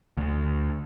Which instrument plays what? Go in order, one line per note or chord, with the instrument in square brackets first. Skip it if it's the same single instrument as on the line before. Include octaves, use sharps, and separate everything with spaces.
[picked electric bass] D2